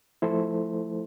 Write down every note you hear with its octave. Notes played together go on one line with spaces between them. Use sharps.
F3 A3 E4 A4 C5